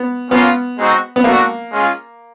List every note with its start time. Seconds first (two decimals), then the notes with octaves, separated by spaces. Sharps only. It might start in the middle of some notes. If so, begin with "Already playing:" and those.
Already playing: B3
0.31 A#3 B3 C#4 F4
0.78 G#3 C4 D#4 F#4
1.16 B3
1.24 A3 A#3 D4 F#4
1.72 G#3 C#4 F4 G#4